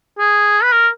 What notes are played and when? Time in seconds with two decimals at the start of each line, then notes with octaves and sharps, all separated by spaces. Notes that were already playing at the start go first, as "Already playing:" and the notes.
0.19 G#4
0.63 B4
0.72 A#4